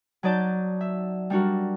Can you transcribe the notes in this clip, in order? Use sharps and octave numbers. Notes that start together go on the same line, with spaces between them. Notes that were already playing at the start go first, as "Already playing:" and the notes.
F#3 D#4 D5 A5 G6
E5
G3 D4 F#4 A#4